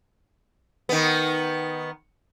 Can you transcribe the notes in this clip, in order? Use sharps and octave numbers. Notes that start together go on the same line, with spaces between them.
D#3 B3